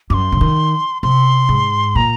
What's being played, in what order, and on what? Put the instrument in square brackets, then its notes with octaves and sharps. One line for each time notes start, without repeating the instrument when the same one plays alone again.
[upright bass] F#2 [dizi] D6
[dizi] C6
[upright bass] C#3
D#3
[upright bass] C3 [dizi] C6
[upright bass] G#2
[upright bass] A#2 [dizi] A#5